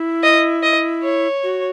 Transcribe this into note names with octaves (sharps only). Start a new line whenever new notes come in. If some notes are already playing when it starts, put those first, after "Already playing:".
Already playing: E4
D#5
D#5
C#5
F#4